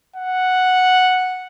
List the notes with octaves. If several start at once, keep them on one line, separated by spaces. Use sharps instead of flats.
F#5